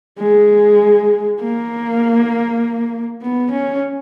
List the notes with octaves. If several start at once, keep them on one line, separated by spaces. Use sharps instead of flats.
G#3
A#3
B3
C#4